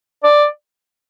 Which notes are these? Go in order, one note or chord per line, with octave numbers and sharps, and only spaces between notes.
D5